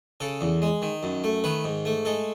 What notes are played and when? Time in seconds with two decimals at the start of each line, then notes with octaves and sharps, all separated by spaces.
0.20 C#3 A4
0.41 E2
0.62 G#3
0.82 D#3
1.03 F#2
1.24 A3
1.44 D#3 B4
1.64 G#2
1.85 A3
2.05 G#3 A4